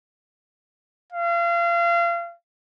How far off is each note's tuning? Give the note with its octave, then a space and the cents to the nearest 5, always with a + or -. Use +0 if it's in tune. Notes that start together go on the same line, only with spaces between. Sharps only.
F5 -30